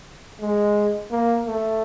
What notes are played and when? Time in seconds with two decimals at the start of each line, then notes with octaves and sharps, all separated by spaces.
0.41 G#3
1.11 A#3
1.47 A3